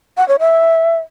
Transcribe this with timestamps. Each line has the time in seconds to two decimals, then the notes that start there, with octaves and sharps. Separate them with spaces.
0.17 F#5
0.28 C#5
0.39 E5